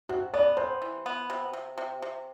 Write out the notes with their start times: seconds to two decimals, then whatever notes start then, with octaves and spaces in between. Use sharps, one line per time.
0.09 C3 F#4
0.34 B3 D5
0.57 C3 C5
0.82 E3
1.06 B3
1.30 C3
1.53 C3
1.78 C3
2.02 C3